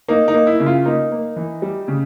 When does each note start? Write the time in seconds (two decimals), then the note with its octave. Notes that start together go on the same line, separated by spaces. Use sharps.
0.08 A#3 D#4
0.28 D#4
0.34 A#3
0.47 E4
0.60 C#3
0.66 F4
0.85 A#3 D#4
1.11 A#3
1.36 E3
1.62 G3
1.88 C#3